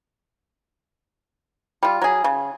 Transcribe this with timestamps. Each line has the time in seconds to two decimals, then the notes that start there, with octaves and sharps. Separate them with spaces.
1.83 G3 F4
2.02 F#3 G#4
2.24 C#3